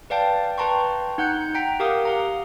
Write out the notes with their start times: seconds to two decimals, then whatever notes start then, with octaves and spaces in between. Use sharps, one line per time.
0.10 B4 D5 F5 G5 A5
0.58 B4 G5 A5 A#5 C6 C#6
1.18 D#4 F#5 F#6 G6 C#7
1.55 G5 A#5 B6 D7
1.80 G4 A#4 F5 F#5 D6 D#6
2.05 F5 F#5 A#5